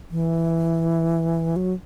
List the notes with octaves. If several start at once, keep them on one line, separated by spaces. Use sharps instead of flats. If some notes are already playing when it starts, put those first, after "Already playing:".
E3
F#3